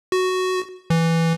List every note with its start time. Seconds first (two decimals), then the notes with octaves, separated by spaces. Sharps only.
0.12 F#4
0.90 E3